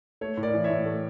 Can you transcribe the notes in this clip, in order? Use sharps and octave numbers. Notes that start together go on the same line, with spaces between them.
A3 C#5
A2
A#4 D5
E3
C#5 E5
A2
A3